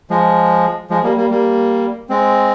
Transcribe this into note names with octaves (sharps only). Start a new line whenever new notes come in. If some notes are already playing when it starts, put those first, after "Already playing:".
F3 G#3
F3 G#3
G3 A#3
G3 A#3
G3 A#3
G#3 C4